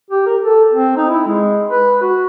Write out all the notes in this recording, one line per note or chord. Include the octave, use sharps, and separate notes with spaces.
G4
A#4
A4
C4
D#4
E4
G#3
B4
F#4